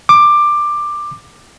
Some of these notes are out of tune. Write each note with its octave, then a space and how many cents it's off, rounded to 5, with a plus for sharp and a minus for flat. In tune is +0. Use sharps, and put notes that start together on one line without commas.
D6 +15